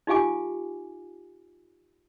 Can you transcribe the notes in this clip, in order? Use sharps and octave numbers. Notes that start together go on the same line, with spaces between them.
D#4 F4 G4 F5 G#5 D6